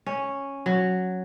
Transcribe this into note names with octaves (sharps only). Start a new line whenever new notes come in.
C#4
F#3